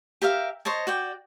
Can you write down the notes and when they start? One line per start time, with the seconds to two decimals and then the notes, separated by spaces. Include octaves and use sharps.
0.22 G4 A#4 E5 F5
0.65 C5 C#5 D#5 A5
0.87 F#4 D5 G5